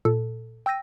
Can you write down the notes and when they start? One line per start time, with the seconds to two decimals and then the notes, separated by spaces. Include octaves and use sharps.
0.05 A#2 A4
0.66 G5 E6 G6 A#6 D#7